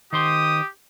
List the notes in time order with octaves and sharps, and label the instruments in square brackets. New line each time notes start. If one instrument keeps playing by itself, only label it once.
[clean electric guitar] D#3 C5 C6 [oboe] G4 [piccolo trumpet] D#6